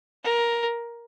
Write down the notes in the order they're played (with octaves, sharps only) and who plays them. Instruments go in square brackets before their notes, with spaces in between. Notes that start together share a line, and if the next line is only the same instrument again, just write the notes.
[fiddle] A#4